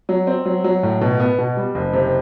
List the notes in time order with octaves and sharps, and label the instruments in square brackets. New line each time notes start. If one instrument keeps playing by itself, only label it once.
[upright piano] F#3
C4
F#3
F#3
A2
B2
B3
B2
G3
F#1
C3